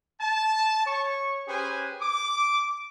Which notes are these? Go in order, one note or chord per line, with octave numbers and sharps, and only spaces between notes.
A5
C#5 C#6
C#4 G4 G#4 B4 C5 G#5
D6